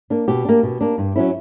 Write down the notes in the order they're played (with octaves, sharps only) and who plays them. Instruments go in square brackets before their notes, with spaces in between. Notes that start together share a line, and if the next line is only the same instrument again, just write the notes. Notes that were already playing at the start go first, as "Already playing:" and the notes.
[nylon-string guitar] A#3 D4
B2 G4
A#3 D4
B2
A#3 D4
G2
F#3 C#4 E4